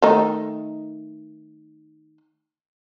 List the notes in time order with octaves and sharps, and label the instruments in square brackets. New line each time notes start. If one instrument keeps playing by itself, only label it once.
[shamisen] D#3 A3 D#4